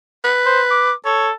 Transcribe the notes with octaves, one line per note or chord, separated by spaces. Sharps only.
B4
C5
D6
A4 C#5